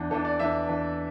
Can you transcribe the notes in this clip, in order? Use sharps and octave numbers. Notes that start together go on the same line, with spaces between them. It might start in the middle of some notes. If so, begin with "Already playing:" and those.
Already playing: E2 E3 D4
E2 E3 D4 A4
D5
E2 E3 D4 E5
E2 E3 D4